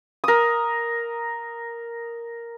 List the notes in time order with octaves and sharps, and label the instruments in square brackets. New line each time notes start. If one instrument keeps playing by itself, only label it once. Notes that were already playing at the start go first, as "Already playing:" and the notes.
[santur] A#4 D#6